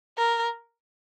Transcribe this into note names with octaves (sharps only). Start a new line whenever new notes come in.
A#4